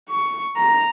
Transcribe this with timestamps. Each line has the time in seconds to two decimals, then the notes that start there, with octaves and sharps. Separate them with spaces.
0.10 C#6
0.57 A#5